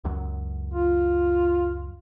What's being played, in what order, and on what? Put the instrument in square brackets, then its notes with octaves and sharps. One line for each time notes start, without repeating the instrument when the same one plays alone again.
[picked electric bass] C#2 F#2 F#3
[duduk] F4